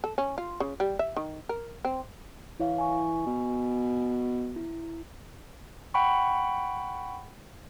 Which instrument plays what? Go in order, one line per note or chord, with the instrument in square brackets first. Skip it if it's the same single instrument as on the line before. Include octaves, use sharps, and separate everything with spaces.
[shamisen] A4
C#4
F4
C#3
G3
E5
D#3
A#4
C4
[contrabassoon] E3 [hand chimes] E4 C#5 F5
[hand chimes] G#5 C#6
[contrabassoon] B2
[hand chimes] E4
[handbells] F#5 G5 B5 C#6